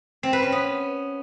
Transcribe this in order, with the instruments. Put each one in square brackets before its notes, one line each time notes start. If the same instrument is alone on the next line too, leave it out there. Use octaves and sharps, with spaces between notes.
[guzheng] C4
B4
C#4
B3